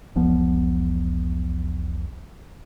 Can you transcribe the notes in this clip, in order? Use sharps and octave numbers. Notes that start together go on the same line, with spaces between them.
E1 B1 F3 B3